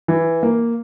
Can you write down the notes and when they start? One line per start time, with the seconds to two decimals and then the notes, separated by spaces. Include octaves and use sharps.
0.08 E3
0.43 A#3